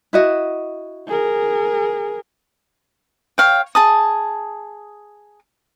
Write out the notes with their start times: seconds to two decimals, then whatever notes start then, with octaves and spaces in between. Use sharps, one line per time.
0.13 E4 F#4 D#5
1.07 G#4 A#4
3.38 C#5 F5 G5
3.75 G#4 A5 D#6